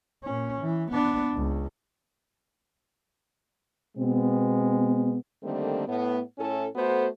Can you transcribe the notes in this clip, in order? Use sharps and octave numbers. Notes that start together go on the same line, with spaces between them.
A#2 C#4
E3
B3 D4
C#2
B2 G#3 B3 C4
D3 D#3 G3 A3 A#3 C4
A2 B3
A2 C#4 E4 A4
A3 B3 F#4 A4 C5